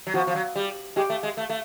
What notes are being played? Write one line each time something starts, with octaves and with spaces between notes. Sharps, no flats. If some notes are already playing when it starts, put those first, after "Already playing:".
F#3
F3 F#4
F3
F#3
G3
G#3 G4
A3
G#3
A3
A3